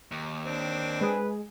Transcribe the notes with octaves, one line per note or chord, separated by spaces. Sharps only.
D#2
C4 D4
G#3 G#4 B4